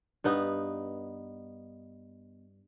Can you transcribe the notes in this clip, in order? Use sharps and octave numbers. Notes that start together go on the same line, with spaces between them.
G2 B3 D#4